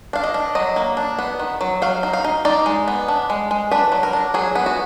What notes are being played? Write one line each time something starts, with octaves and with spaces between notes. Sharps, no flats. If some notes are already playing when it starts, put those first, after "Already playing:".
D4 F5
D#5
D4
F#3 D#5
A#3
D4
B3
D#3
F#3
F#3 F5
D#4
F5
D#4
D#4 D5
G#3
B3
D4
G#3
G#3
D4 B4
F#3
A#4
D4
F#3 G#4
B3
F#4